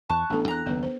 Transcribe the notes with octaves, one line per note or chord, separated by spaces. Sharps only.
E2 A5 C#6 F#6
A1 A#3 B3 D4 A4
E2 A#5 F#6
F#1 D#2 B3 B4
C5